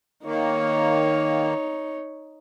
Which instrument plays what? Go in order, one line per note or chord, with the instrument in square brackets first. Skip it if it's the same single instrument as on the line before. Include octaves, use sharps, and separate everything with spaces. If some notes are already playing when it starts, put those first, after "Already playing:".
[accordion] D#3 A#3 [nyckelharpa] D#4 C#5